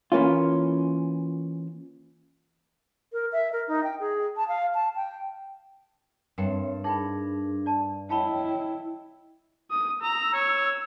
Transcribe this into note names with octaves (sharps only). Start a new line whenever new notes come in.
E3 A#3 C#4 F4
A#4
E5
A#4
D#4
G5
G#4
A5
F5
A5
G5
G2 C4 A#4 C#5 E5 F#5 G5
D4 D#4 G#4 A#4 G5 B5
D5 A5
E4 C#5 D#5 F5 G5 A5 B5
D#6
A#5 E6
C#5